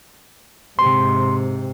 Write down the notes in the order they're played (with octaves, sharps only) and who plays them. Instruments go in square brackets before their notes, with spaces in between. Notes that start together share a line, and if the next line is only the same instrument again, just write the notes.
[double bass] G#2 C3 [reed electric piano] C6